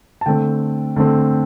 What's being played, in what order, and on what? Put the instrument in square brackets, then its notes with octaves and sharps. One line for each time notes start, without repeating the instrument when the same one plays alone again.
[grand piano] A5
D3 A3 C4 G5
D3 A3 C4